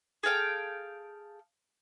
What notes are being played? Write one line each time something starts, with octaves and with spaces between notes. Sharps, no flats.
G#4 A4 F5 G5